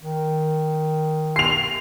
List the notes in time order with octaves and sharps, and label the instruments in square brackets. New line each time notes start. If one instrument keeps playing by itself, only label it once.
[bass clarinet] D#3
[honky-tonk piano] C7 F7